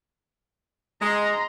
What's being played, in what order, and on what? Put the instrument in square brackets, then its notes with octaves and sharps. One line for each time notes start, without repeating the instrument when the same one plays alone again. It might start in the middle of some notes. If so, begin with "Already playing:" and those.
[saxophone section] G#3 [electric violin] A#5 C6